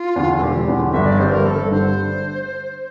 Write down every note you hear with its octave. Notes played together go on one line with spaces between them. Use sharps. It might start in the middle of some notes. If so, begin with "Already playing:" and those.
Already playing: F4
E2 D3
A4
E1 G4
E2 D3
G1 E5
D5
G2 D3 C5
A#4
G1 A4
G2 D3 C5